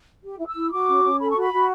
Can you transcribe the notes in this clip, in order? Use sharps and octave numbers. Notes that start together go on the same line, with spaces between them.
G4
E4
E6
E4
F#4 D6
C#4
C#4
A4 B5
C#6
F#4 B5
F#4